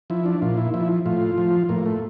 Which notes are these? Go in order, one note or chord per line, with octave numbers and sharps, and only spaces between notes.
F3 E4
D4
A#2 F4
E4
F3 E4
A2 F4
F3
A2 A#3
A3